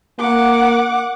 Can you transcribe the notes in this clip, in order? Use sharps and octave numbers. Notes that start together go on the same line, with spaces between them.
A#3 F#5 D6